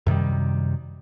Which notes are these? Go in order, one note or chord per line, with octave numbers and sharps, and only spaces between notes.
F#2 C3 D#3 G3